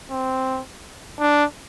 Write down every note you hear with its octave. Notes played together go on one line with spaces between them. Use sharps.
C4
D4